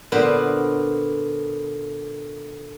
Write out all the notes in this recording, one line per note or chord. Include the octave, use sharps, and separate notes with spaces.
A#2 D3 B3 B4 C5